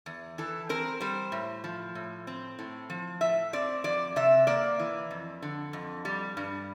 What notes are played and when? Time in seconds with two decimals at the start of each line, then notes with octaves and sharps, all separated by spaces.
0.06 E2
0.38 E3 A4
0.69 C4 A#4
1.01 G3 C5
1.32 A2
1.64 F3
1.95 A2
2.27 C4
2.59 A2
2.90 F3
3.21 A2 E5
3.53 C4 D5
3.84 F2 D5
4.16 C3 E5
4.47 A#3 D5
4.79 E3
5.11 F2
5.42 D3
5.73 F2
6.05 G3
6.37 G2